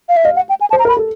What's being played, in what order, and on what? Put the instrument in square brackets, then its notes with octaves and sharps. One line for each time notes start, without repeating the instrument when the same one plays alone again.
[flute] F5
E5
[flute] D#5 [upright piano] F5
[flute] F#5
G5
G#5
A5
[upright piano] C5
[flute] A#5
[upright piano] A#4
[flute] B5
[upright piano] A4